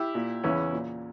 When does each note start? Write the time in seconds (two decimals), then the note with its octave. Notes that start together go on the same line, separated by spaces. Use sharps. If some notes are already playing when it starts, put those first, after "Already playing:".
Already playing: E4 G4
0.15 A#2
0.44 E2 C#3 E3 C#4 E4
0.73 A#2